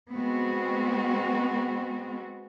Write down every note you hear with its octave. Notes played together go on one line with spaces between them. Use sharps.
G#3 B3 C4 F#4